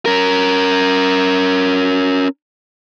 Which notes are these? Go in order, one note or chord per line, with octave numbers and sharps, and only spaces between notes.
C#4 A#4